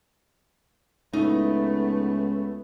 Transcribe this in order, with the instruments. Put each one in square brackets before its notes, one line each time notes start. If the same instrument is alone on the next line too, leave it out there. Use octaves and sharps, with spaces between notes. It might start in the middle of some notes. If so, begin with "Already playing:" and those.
[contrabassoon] C#2 [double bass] A3 B3 [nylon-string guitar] D#4